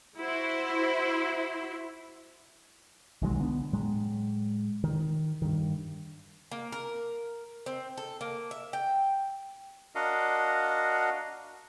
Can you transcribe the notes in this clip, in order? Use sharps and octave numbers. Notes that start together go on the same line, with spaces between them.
E4 F#4 C5
B1 D#3 F#3 G#3
D3 B3 D4
A2 F#3 G#3
D#3
G2 D#3
A#3
A#4
C4
A4
A#3
E5
G5
D4 F#4 A#4 D#5 F5 F#5